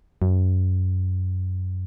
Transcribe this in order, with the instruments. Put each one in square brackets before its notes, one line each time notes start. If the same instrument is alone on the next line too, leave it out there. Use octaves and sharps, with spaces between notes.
[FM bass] F#2